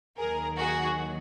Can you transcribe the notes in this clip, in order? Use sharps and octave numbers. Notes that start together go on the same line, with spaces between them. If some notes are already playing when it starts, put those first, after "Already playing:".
D#2 D#3 F#3 G#4 A#4
F#4 G#4